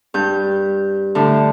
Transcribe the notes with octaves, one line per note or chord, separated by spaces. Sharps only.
G2 G6
A2 D3